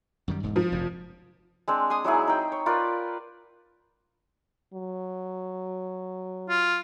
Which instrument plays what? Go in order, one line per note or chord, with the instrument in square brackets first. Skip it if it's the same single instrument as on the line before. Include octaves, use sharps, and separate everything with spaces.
[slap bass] F#2 D#3 G3
E1 G#2
[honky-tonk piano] F3
[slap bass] F1 F#2
[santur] G#3 C4 D4
G#5 C6 D#6
F#3 D#4 E4 G#4
D#4 G5
C#5
F4 A#4 B4 D5
[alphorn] F#3
[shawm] F4